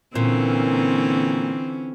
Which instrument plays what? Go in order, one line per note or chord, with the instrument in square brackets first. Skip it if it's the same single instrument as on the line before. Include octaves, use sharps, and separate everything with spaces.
[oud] A#2 [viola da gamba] D3 E3 C#4 [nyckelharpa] C4